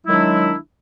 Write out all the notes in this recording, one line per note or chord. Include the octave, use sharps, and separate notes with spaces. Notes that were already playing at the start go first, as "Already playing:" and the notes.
D#3 F#3 G#3 D4 E4